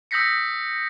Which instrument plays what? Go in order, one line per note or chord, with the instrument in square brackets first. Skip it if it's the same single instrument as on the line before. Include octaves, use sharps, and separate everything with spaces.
[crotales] D#6 E6 G6 A#6 B6 C#7